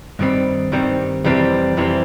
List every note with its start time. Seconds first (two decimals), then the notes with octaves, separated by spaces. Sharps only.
0.19 G2 D#3 G3 C4
0.72 G2 D#3 G3 C4
1.24 F2 C3 E3 G3 C4
1.77 F2 C3 E3 G3 C4